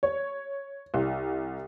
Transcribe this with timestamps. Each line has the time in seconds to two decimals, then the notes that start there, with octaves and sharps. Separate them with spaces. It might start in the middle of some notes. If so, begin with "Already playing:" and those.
0.03 C#5
0.94 C2